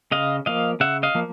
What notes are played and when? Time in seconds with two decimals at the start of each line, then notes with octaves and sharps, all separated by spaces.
0.12 C#3 D#5 F5
0.46 F3 A#3 D#5 F5
0.80 C#3 E5 F#5
1.03 D#5 F5
1.15 F3 A#3